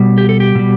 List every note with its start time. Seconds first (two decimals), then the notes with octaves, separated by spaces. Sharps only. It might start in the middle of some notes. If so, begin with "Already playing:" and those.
Already playing: B2 G3
0.18 G4
0.29 A4
0.40 G4
0.55 B2 G3